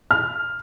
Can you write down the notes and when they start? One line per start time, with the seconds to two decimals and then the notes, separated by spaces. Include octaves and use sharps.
0.11 F6